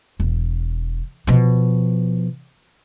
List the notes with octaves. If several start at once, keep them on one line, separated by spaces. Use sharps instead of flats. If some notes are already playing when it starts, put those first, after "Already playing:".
E1
B2 F3